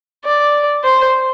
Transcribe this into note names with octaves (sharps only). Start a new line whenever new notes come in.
D5
C5